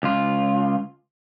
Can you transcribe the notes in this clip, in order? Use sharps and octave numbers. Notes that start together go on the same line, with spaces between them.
C#2 F4